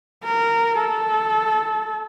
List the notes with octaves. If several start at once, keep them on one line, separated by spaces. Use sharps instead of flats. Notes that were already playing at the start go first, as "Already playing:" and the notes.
A#4
A4